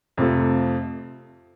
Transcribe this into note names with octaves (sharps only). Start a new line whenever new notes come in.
F2 C3 F3 A3